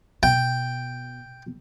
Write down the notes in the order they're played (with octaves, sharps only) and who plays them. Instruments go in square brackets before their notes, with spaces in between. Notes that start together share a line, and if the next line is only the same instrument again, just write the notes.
[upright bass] B2 [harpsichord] G5